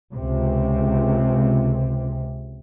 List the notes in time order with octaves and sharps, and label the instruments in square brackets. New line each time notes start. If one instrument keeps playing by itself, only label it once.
[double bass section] C#2 C3